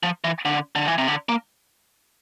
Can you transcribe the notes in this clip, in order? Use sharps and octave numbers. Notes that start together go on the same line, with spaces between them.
F3
E3
D3
D3
E3
C3
D3
A#3